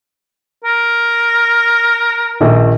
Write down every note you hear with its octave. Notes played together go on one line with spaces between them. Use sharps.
A#4
A#1 D#3